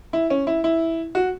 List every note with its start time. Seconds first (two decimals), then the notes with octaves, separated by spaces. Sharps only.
0.13 E4
0.30 C#4
0.47 E4
0.64 E4
1.15 F#4